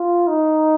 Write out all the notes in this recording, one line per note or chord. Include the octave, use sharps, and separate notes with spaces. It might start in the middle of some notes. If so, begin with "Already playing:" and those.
Already playing: F4
D#4